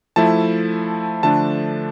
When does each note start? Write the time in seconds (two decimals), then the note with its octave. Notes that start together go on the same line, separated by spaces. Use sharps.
0.16 F3 A3 E4 A5
1.23 D3 F3 A3 D4 A5